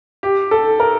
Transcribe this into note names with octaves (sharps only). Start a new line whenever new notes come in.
G4
A4
A#4